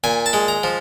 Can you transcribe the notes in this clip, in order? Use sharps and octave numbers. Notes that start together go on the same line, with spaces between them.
A#2 G#5
A5
G#3
A#5
F3